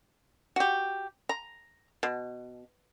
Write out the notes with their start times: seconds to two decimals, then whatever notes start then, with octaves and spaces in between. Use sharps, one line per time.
0.56 F#4 G4
1.29 A#5
2.03 B2